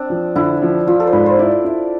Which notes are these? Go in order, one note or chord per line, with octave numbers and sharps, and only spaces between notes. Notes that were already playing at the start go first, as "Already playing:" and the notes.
Already playing: C4 D4
F3
D3 E4
F3
F3 F4
A4
C5
G#2 B4
C5
E4 D5
E4